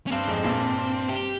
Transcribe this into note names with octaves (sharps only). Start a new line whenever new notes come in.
C#4
G2 C4
F2 G#2
G2 A#2
G4